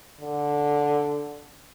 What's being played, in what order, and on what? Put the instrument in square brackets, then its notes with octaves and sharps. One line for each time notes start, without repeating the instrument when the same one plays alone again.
[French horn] D3